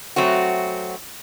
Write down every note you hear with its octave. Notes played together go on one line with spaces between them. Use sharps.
F#3 A3 C4 F#4